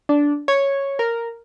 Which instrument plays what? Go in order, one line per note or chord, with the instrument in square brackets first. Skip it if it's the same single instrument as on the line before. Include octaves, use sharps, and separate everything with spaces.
[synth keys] D4
C#5
A#4